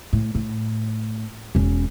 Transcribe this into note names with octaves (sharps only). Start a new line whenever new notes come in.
A2
A2
E1 C#4